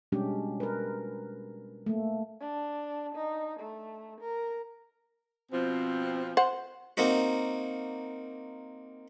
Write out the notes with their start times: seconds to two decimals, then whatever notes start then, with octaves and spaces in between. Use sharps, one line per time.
0.12 B2 G3 G#3 C#4 D4 G4
0.60 A#4 B4
1.86 A3 A#3
2.40 D4
3.15 D#4
3.60 A3
4.21 A#4
5.52 B2 F3 C4
6.37 C5 F#5
6.97 A#3 C4 D#4 F#4